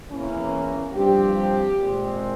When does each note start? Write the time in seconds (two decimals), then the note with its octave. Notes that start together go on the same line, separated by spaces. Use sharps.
0.10 E2 E3 A#3 C#4
0.93 G2 F3 C4 G4
1.76 A#2 G#3 C4